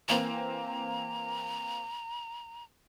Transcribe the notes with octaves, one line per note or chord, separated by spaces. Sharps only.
E3 A#3 C4 A#5